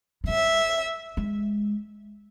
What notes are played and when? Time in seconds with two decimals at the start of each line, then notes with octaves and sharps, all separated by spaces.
0.24 G#3
0.28 G3 E5
1.17 G#3